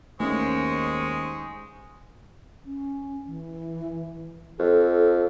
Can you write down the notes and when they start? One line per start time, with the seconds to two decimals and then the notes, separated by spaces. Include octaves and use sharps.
0.20 D#2 G#3 A3 C4 C#4 C5 C#6 D#6
2.66 C#4
3.26 E3
4.59 F2 A4